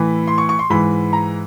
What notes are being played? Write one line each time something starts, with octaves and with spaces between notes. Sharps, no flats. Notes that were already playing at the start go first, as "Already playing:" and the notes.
Already playing: A2 E3 B5
C6
C#6
C#6
C6
G#2 E3 B5
A#5